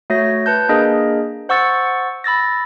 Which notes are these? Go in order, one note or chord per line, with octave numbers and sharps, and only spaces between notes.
A3 F#4 C#5 A#6
B4 A5 G6
A#3 D4 G#4 A#4 D#5
C5 F#5 C#6 E6 A6
B5 E6 A6 A#6